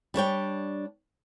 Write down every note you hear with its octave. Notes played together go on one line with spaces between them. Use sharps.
G3 D4 C#5 G5